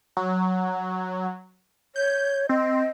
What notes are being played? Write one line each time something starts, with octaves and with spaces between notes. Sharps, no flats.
F#3
C#5 G6
C4 D#5